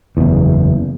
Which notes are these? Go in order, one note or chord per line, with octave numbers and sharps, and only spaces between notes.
F#1 E2